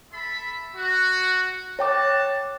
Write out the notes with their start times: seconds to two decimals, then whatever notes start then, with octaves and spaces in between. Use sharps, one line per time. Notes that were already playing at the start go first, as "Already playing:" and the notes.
0.13 A4 E5 B5
0.75 F#4
1.79 F#4 C#5 G5 A5 D6